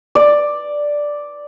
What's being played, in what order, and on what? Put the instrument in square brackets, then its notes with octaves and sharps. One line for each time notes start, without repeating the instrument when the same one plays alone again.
[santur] D5